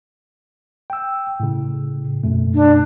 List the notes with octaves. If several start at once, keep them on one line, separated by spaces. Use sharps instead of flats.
G5 E6
A2 C#3
F#2 B2 A3
D4